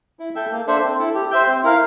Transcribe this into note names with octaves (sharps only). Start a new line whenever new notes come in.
E4
A4 E5 G5
A#3
D4 A4 C5 E5
C4
E4 A4
G4
C5 E5 G5
C4
E4 A#4 F5